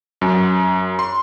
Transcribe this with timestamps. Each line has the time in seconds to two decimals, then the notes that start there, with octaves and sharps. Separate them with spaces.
0.21 F#2
0.99 C6